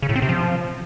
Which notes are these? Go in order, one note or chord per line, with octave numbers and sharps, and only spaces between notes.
C#3
A2
C4
C3
F3